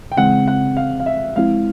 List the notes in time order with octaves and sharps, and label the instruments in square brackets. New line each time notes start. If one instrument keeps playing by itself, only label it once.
[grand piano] G5
[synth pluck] C#3 E3 G#3 C4 [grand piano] F#5
[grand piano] F#5
F5
F5
E5
[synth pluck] F3 G#3 C4 E4 [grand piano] F5